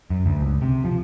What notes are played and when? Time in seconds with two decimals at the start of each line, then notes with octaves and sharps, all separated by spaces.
0.10 F#2
0.26 D2
0.41 C#2
0.61 C3
0.85 F3